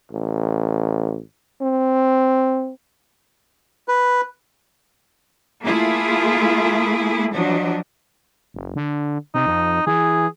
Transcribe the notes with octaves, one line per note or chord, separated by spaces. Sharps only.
A1
C4
B4
A3 A#3 E4 F4 G#4
F3 F#3 D4 D#5
F#1
D3
C3 D#4
F2
E3 G#4